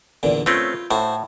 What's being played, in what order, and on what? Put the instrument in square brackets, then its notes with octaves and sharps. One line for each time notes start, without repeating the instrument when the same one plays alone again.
[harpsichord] E2 A#2 D3
[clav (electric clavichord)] A3 C4 C#4 [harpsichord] F4 B4
[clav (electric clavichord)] A2 [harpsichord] F#4 A4 C5